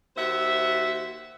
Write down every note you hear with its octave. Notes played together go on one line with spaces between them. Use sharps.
D#2 F#4 C5 E5